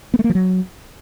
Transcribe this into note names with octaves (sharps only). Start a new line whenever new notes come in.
B3
A3
A#3
F3
F#3